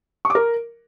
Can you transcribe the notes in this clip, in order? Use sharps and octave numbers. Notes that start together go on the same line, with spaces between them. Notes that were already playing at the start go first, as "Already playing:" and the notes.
C#6
D6
A#4